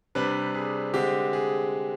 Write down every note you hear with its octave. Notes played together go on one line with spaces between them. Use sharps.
C3 G3 D4 B4
G#4
D3 G#3 C4 G4
G#4